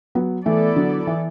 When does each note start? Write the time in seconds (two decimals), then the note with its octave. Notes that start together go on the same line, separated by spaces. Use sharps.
0.15 F#3 B3
0.46 E3 A3 B3 E4 A4 D5
0.76 D3 F#3
1.07 E3